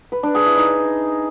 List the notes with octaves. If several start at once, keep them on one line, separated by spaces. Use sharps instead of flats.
B4
D4
G#4
E4
D#4